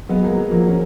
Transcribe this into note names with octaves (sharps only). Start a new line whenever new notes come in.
F#3 G#3 B3
F#3 A#3
F#3
F3 F#3 A#3
C#4